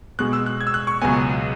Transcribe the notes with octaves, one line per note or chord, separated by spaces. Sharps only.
B2 G#3 B3 F#6
E6
F#6
G#6
E6
F#6
C#6
C#2 B2 F#3 B3 G#5